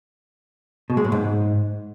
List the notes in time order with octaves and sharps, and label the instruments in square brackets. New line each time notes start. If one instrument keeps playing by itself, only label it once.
[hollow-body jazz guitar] B2
G#3
A2
G#2